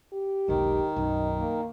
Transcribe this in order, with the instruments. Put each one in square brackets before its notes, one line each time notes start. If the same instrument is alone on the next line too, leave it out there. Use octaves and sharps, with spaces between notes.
[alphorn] G4
[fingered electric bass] E1 B1 G#2 [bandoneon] D#3
[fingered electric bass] B1 F#2 [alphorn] D#4
[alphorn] A#3